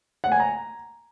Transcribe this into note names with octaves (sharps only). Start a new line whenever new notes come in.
F#5
G#5
A#5